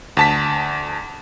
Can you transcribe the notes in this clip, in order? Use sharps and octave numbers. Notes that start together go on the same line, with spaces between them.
D2 A5 B6